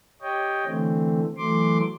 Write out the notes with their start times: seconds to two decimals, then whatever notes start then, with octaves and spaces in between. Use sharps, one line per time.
0.22 G4 C#5 D#5 G5
0.66 D3 E3 A3 C4
1.37 E3 F#3 A3 C6 D6